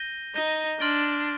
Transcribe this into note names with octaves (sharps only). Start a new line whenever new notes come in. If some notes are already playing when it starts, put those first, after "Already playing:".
Already playing: G6 A#6 D#7 G7
D#4 G6 A#6 D#7 G7
D4 C6 F6 A6 D7 G7